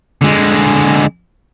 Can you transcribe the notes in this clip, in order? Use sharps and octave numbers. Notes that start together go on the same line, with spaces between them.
D3 G#3